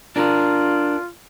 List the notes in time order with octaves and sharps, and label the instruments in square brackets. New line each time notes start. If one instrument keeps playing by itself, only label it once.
[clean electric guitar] D4 A#4 [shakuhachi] F4